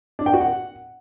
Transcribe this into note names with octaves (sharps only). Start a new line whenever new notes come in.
D4
G5
F#4
F#5